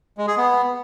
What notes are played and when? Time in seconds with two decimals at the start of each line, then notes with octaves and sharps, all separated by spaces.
0.18 G#3
0.28 G#4
0.37 B3